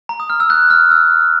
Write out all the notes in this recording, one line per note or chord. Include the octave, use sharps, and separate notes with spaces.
A#5
D#6
F6
E6
F#6
F6
E6